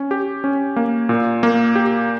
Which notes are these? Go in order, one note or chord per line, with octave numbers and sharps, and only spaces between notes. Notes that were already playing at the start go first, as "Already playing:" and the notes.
Already playing: C#4
G4
C#4
A#3
A#2
A#3
G4